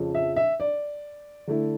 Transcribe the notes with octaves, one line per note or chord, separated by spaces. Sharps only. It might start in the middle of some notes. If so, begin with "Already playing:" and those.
Already playing: F2 C#3 F3 C#4
E5
E5
D5
D3 A3 E4